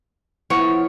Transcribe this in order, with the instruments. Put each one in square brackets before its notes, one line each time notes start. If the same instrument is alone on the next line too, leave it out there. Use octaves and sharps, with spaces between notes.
[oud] F3 B3 E4 [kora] C#5